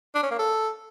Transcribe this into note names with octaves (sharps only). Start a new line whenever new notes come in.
D4
C#4
A#3
A4